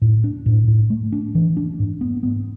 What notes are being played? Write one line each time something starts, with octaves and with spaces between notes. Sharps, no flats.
A2
D4
A2
A2
A3
D4
E3
D4
G#2
B3
B3